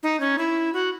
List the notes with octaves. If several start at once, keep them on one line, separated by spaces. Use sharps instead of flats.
D#4
C#4
E4
F#4